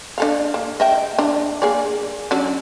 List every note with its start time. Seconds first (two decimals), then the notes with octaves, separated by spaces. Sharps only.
0.18 D4 A4 F5
0.54 A#3
0.80 D#5 E5 G5
1.19 D4
1.62 A#3 G#4 D5
2.31 F#3 C#4 D4